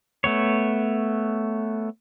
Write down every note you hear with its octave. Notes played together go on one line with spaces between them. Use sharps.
A3 B3 C#5